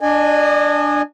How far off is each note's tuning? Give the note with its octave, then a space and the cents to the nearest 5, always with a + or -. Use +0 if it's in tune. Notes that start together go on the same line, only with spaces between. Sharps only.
D4 +0 D#5 -35 G#5 -5